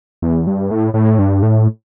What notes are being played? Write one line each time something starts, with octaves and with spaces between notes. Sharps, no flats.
E2
G2
A2
A2
G2
A2